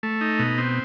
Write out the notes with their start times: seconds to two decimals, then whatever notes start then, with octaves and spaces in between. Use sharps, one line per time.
0.03 A3
0.21 D#4
0.39 B2
0.58 C4